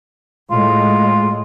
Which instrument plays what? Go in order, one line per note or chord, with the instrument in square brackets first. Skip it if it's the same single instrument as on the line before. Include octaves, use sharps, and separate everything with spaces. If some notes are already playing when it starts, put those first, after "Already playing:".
[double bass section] A2 G#3 [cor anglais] F4